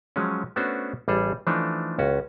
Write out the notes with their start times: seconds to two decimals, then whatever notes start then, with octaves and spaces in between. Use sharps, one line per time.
0.16 F3 F#3 G#3 C#4
0.56 A3 B3 C#4 D4 F#4 C5
1.08 A1 G3 G#4 A4
1.47 E3 F3 A3 D4 D#4
1.99 C#2 C#4 F#4